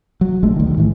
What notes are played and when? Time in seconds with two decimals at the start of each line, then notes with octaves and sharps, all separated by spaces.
0.21 F#3
0.43 A#1 G#3 A3
0.56 D2 D#3
0.77 A2 E3